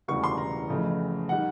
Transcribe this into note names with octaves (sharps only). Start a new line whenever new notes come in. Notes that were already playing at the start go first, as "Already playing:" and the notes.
E1 D2 C#3 E3 G3 C#6
C6
A#5
F2 C#3 E3 A3
D#3 G3 F#5